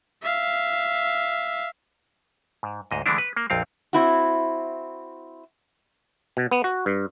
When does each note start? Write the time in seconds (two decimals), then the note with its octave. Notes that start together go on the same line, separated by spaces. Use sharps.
0.22 E5 F5
2.63 G#2
2.91 D2 G#2 D#5
3.06 D3 E3 G#3 A3 D4 E4
3.18 B4
3.36 A#3
3.50 A#1 F2 C4 F5
3.93 C4 E4 F#4
6.37 B2
6.51 B3
6.64 F#4
6.86 G2